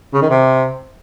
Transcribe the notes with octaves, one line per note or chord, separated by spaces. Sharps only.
C#3
D#3
C3